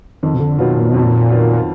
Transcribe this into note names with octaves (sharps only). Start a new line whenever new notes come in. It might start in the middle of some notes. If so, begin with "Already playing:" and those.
F2 D#3
B2
D3
B2 D#3 F#3 B3 F4
A#2
F2 B2
A#2
D#3 F#3 B3 F4